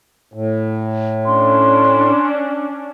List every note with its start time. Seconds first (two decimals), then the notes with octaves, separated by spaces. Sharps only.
0.34 A2
1.26 C#4 D4 C6